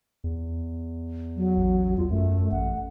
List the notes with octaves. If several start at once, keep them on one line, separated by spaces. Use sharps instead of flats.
E2
F#3
A1
E2 F4
F#2 A3
A1 F#5